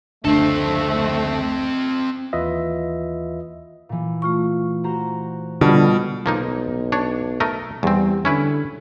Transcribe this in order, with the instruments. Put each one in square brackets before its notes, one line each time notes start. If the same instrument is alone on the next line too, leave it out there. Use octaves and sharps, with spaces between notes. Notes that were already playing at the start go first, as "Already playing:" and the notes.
[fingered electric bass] F#1 D2 [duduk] A3 [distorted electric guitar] C4 A4 [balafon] D4
[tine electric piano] D#2 E3 F4 B4 D#5 E5
[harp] A#2 E3
[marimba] A3 F4 C#6
[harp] F#4 C5 A#5
[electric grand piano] B2 [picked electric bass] D3 [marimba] G3 F4 B5 [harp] G#6
[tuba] B1 [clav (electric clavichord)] F3 A#3 D#4
[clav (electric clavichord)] D4 C#5
A3 A#4 D#5
[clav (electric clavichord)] E2 C4 [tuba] G3
[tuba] D3 [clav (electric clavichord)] C#4 E4 B4